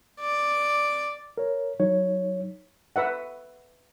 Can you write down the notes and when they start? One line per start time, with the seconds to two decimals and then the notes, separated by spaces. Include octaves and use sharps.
0.20 D5
1.38 A#4 C#5
1.80 F#3 D#4 C#5
2.96 B4 E5 F#5